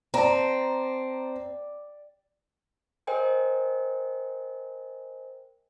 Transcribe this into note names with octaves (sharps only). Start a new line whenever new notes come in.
C4 D5 A5 A#5
A#4 C5 D#5 G5 G#5